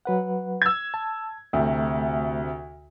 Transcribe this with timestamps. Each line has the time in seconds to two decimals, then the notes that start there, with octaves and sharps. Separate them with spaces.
0.05 F#3 B4 F#5
0.62 E6 G#6
0.94 A5
1.53 D2 C3 A3